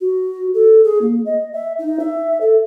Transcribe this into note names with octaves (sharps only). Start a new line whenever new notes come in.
F#4
A4
G#4
A#3
D#5
E5
D#4
E5
A4